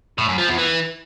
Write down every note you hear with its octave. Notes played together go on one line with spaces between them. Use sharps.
A2
F#2
F3
E2
E3